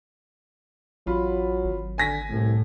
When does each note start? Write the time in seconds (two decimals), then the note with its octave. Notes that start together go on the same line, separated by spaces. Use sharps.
1.07 A1 F#3 F4 B5
1.64 G#1
1.98 D3 G#5 A#6 B6
2.29 C2 A2